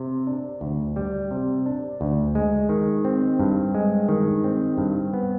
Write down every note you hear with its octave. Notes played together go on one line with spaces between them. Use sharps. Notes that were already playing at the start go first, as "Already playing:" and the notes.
Already playing: C3
D4
D2
G3
C3
D4
D2
G#3
D#3
C4
G2
G#3
D#3
C4
G2
B3